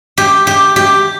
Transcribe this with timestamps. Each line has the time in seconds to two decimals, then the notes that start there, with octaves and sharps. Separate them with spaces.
0.18 G4
0.47 G4
0.76 G4